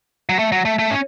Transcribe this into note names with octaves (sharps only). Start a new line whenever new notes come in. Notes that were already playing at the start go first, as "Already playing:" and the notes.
F#3
A3
F#3
A3
A3
C#4